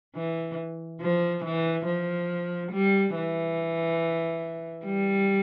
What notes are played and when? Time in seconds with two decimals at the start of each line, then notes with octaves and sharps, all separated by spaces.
0.16 E3
1.01 F3
1.44 E3
1.86 F3
2.71 G3
3.15 E3
4.85 G3